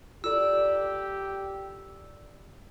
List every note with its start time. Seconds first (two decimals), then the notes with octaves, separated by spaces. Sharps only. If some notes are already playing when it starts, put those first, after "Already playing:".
0.24 F4 G4 A4 A#4 D5 E6